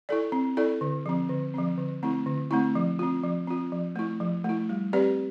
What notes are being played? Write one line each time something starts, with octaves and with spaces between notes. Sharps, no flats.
E4 A4 D5
C4
E4 A4 D5
D3
F3 C4
D3
F3 C4
D3
A3 C4 E4
D3
A3 C4 E4
F3
C4 F4
F3
C4 F4
F3
A3 E4
F3
A3 E4
G3
C4 G4 B4 D5